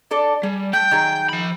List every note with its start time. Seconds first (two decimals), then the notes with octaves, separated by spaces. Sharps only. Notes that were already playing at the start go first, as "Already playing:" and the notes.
0.11 D4 A4 D5
0.43 G3 G#4
0.73 A3 G5 G6
0.91 D#3 F#3 G#4
1.29 F3 B5